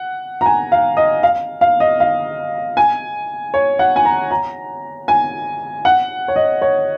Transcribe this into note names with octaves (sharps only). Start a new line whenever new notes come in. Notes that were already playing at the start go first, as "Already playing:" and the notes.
Already playing: F#5
A#5
G#5
F5
D#5
F5
F5
D#5
F5
G#5
C#5
F#5
G#5
A#5
A#5
G#5
F#5
C#5
D#5
C#5